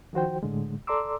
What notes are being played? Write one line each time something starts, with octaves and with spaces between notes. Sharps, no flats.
D#3 F3 F#4 C5 G5
A2 D3 G#3
A4 D5 A#5 C6 D6 E6